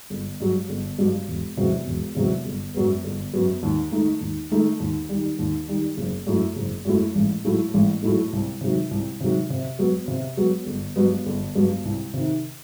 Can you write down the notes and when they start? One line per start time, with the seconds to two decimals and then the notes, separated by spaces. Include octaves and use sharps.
0.10 G1
0.40 G2 F#3
0.69 G1
0.98 G2 F#3
1.28 E1
1.57 E2 C3 F#3
1.86 E1
2.15 E2 C3 F#3
2.45 G1
2.74 F#2 F#3 B3
3.04 G1
3.33 F#2 F#3 B3
3.63 D#2
3.91 D#3 A3 D#4
4.21 D#2
4.50 D#3 A3 D#4
4.80 D#2
5.09 D#3 G3
5.39 D#2
5.68 D#3 G3
5.97 F#1
6.27 F#2 F#3 A3 E4
6.56 F#1
6.85 F#2 F#3 A3 E4
7.15 A1
7.44 A2 F#3 A3 E4
7.74 A1
8.02 A2 F#3 A3 E4
8.33 C2
8.61 C3 D#3 F#3
8.91 C2
9.20 C3 D#3 F#3
9.50 C3
9.79 F#3 B3
10.08 C3
10.37 F#3 B3
10.66 G1
10.96 G2 F#3 B3
11.26 G1
11.55 G2 F#3 B3
11.85 C2
12.14 C3 D#3